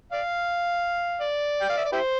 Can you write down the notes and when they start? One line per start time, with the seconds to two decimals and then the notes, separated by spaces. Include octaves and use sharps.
0.13 D5 F5
1.21 D5
1.62 G5
1.70 F5
1.78 E5
1.85 D5
1.92 E4 G4 C5